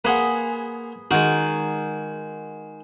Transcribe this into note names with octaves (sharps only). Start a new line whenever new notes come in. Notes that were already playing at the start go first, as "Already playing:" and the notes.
A#3 G#4 B4 C5 F#5
D#3 G#3 F#4